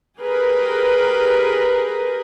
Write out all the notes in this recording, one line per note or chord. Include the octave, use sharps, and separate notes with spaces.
G4 G#4 A#4 B4